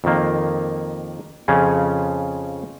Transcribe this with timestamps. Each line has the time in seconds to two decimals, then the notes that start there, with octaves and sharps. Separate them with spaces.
0.04 F2 D#3 A#3
1.48 F2 C#3 F3 C#4 F4